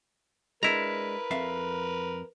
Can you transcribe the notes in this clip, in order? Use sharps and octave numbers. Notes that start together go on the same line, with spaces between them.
G#3 D4 E4 A#4 B4 A#5
F2 E5 F5